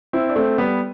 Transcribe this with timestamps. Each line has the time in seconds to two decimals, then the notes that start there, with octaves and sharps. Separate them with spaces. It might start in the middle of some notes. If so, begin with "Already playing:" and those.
0.13 C4 E4
0.29 D4
0.36 A3 C4
0.58 G3 B3